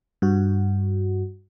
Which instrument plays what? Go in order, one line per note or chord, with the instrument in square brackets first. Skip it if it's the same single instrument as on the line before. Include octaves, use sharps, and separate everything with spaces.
[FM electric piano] G2 F#4